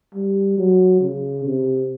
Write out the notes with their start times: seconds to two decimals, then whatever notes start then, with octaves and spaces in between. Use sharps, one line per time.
0.15 G3
0.58 F#3
1.01 C#3
1.45 C3